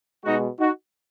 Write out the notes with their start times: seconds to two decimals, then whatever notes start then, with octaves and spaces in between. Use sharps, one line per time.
0.24 B2 G#3 D#4 F#4
0.60 D#4 F#4